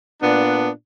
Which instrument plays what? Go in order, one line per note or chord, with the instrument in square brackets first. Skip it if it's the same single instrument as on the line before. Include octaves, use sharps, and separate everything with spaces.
[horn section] A#2 B3 D4